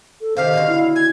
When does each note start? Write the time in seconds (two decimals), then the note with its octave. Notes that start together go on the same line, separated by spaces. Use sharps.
0.21 A4
0.37 C3 D#3 G4 C5 F5
0.54 B2 D3 F#4
0.68 E4
0.96 G#5 G#6